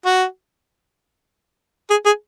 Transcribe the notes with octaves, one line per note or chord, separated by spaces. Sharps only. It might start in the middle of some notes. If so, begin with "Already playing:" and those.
F#4
G#4
G#4